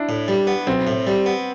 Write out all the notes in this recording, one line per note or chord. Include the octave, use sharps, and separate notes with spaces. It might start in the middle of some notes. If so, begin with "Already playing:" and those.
Already playing: D4 E4
A2
G3
B3
B1 C4
A2
G3
B3